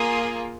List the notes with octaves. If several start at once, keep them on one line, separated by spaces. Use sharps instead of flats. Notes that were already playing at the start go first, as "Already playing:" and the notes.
Already playing: A#3 F4 G#4 C6 D#6